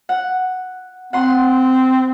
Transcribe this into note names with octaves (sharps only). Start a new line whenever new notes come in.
F#5
C4 F#5 C6